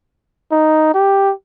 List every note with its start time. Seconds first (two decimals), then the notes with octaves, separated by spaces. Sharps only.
0.52 D#4
0.94 G4